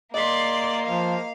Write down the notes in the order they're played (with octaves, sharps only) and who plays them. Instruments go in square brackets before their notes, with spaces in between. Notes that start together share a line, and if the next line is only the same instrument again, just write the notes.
[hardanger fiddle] A#3 [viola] D5 C6 [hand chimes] D#5 B6
[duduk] F3 [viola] F5